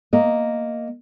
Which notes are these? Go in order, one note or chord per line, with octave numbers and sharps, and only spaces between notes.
A#3 D#5